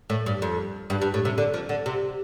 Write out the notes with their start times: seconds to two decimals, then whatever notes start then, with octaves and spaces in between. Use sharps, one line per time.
0.10 A2
0.26 G2
0.42 F2
0.90 G2
1.01 G2
1.14 A2
1.25 C3
1.38 D3
1.54 F3
1.69 D3
1.86 C3